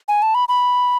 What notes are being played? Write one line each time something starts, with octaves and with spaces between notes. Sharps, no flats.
G#5
A5
B5
B5